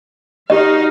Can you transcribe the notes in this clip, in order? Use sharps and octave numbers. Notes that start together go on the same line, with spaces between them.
D#4 F#4 G4 D#5 F5